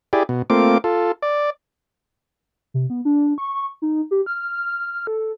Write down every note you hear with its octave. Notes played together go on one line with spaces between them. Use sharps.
E4 G4 G#4 D5
B2
A3 A#3 C4 F4 D6
F4 A4
D5
C3
B3
D4
C#6
D#4
G4
F6
A4